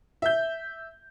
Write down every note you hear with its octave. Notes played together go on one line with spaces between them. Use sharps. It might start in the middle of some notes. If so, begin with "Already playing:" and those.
E5 G6